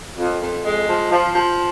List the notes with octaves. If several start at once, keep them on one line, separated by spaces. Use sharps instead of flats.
F2
F2
G#3
F3
F3
F3